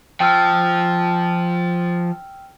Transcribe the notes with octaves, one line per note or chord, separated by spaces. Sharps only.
F3 G5 E6 F6